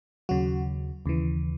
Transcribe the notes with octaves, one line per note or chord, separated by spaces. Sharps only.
D#2 C#3 F#3 F#4
D#2 C#3 E3